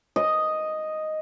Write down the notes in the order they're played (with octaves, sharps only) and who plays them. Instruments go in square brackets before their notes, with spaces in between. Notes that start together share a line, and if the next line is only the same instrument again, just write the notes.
[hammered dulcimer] D#5